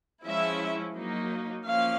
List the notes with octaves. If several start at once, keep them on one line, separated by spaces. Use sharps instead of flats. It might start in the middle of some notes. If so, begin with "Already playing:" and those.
F3 G#3 C#4 E4 E5
F#3 A#3 D#4
F3 A#3 C#4 F5